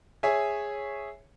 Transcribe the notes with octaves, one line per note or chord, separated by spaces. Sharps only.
G#4 C#5 E5 G#5